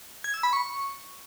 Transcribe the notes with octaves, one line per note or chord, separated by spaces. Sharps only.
G#6
E6
B5
C#6